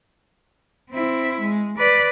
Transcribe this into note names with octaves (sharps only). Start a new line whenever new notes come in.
C4 E4
G#3
B4 D5